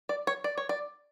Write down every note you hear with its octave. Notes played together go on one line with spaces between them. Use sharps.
D5
C#5
D5
C#5
D5